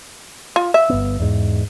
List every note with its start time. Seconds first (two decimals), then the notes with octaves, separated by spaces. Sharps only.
0.56 F4
0.74 E5
0.90 G1 B3
1.20 E2 G#2